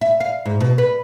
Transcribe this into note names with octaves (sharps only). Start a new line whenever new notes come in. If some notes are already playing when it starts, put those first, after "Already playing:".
E5
F5
G#2
B2
B4